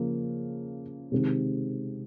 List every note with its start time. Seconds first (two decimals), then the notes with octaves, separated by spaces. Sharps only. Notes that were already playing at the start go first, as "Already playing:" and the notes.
Already playing: C#3 F3 A#3
1.12 C3 D#3 G#3 C4